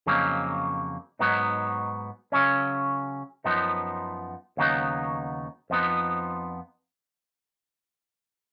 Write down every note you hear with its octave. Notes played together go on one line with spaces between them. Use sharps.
F2 C#3 F#3 A#3 D#4
G#2 F#3 B3 D#4
C#3 F#3 C#4
F#2 F3 B3 D#4
D#2 C#3 F#3 B3 D#4
F2 F3 B3 D#4